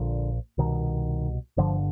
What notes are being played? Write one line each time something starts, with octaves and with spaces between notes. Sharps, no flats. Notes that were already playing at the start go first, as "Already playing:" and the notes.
Already playing: A#1 A#2 D3
C2 B2 D#3
G1 G2 D3 F3